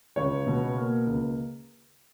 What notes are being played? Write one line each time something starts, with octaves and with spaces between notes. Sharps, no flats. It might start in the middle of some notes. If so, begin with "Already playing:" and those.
C#2 C#5
B2
A#3
C#2